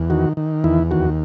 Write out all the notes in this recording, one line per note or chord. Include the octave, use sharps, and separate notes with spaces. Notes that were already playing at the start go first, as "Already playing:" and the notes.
Already playing: E2
D#3 F#4
D#3
E2 E4
D#2 F#4